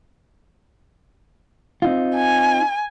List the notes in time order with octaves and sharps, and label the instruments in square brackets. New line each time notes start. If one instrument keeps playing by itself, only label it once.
[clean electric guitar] C4 D#4 F4
[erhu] G#5